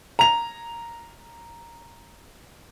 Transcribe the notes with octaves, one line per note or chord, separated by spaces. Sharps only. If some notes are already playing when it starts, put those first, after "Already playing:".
A#5 F7